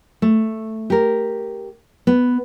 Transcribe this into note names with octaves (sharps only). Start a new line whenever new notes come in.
A3
G4 A#4
B3